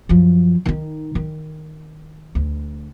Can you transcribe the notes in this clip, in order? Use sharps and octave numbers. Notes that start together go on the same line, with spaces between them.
F#2 F3
D#3 D#4
D#3
D2